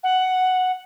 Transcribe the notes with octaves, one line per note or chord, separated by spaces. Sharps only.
F#5